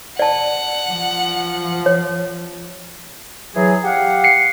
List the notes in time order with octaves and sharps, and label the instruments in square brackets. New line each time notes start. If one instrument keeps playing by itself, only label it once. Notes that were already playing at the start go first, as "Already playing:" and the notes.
[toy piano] D5 A5 [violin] F#5
[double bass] F3
[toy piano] C#5
[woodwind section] E3 F#3 G#4
G4 F5 F#5
[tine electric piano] C7 C#7